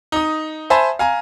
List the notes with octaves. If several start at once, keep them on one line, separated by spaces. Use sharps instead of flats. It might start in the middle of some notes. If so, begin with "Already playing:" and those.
D#4 D#6
C5 E5 G#5 A5 B5 C6
F5 G#5 A#5